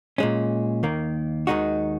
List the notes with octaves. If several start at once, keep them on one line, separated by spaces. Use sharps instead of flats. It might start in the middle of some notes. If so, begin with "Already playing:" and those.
A#2 G#3 C#4
D#2 D#3 A#3
D#2 D#3 G#3 D#4 F#4